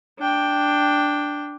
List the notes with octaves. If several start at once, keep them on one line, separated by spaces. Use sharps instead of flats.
D4 G5